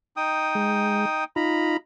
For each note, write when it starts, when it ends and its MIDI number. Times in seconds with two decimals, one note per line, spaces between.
0.17 1.24 63
0.17 1.24 79
0.17 1.24 87
0.55 1.05 56
1.36 1.77 63
1.36 1.77 65
1.36 1.77 82
1.36 1.77 83